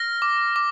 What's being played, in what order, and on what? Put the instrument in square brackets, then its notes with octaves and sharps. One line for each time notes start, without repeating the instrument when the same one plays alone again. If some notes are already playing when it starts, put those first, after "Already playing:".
Already playing: [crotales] F6 A#6
D6
D6